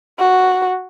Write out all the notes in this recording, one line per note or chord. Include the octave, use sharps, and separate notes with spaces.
F#4